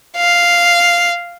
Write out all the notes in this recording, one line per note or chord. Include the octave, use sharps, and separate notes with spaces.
F5